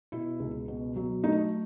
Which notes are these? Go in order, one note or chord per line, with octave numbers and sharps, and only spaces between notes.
B2 E4
C#2
B2
F#3
A3 D#4